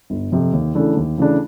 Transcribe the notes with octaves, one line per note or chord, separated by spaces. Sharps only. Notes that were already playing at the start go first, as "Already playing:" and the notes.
G1
F2 C3
D#2
C#3 E3 A3 D4
D#2
C#3 E3 A3 D4